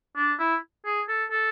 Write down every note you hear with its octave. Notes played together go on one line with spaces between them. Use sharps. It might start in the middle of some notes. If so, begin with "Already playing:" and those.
D4
E4
G#4
A4
A4